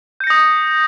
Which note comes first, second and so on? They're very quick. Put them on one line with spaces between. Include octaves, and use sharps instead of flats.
G6 C#7 A#6 D#6